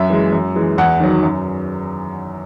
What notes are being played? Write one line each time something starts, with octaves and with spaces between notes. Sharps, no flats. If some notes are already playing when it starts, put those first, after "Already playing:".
Already playing: F#2 E5
E3 G#3
F#2
E3 G#3
E2 F#5
D#3 F#3
F#2